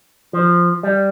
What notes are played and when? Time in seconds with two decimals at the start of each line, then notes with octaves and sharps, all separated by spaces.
0.33 F3
0.83 G3